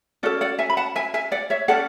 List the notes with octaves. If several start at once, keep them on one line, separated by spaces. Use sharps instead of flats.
C#4 F#4 A4 D5 F#5
D5 F#5
E5 G#5
B5
F#5 A5
E5 G#5
E5 G#5
D5 F#5
C#5 E5
C#4 F#4 A4 D5 F#5